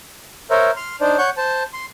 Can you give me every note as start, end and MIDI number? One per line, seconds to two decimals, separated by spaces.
0.50 0.71 70
0.50 0.71 72
0.50 0.71 73
0.50 0.71 76
0.77 0.96 84
0.77 0.96 89
1.01 1.17 62
1.01 1.17 63
1.01 1.17 72
1.01 1.17 74
1.18 1.30 73
1.18 1.30 78
1.18 1.30 85
1.18 1.30 91
1.37 1.63 72
1.37 1.63 81
1.73 1.86 84